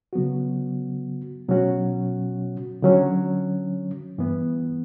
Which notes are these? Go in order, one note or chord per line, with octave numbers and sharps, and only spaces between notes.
C#3 F#3 B3 F#4
B2 F#3 C#4 F#4
D3 F#3 C#4
G2 E3 B3